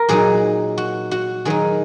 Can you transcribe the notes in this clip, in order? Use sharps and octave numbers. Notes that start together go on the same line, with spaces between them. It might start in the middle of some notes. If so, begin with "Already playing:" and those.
Already playing: A#4
A#2 F#3 D#4 G#4
F#4
F#4
D#3 F#3 D#4 G#4